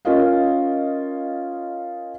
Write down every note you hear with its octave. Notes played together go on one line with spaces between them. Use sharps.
C#4 F4 A#4 D#5 F5